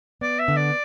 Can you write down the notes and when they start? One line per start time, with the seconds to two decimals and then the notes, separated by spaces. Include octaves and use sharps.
0.21 B3 D5
0.39 E5
0.48 D3
0.57 D5